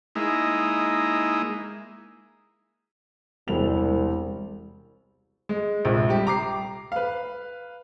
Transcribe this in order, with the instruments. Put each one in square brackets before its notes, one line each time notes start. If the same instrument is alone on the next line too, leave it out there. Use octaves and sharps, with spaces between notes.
[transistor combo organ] G#3 A#3 D#4 E4
[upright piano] E1 F7 [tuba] C2
[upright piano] G#3
A#1 C3
G3 G4
A#5 D6 C7
B4 F5